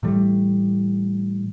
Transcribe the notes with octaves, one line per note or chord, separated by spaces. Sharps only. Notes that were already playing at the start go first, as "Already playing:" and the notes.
A2 E3 G3 A3